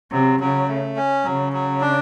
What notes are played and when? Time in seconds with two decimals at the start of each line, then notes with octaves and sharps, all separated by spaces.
0.12 C3 F#3
0.40 C#3 F#3
0.68 A3
0.96 C#4
1.25 C#3 F#3
1.53 F#3
1.81 D4